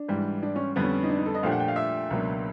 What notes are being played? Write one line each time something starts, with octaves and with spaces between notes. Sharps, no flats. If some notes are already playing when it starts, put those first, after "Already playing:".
Already playing: D4
G#2 E3 G3
D4
C#4
F2 D3 G3 B3
C#4
D#4
D4
D#4
A4
D#5
A#2 F3 A3 D4 G4 F5
F#5
G5
F5
E5
C#2 B2 F#3 A#3 D4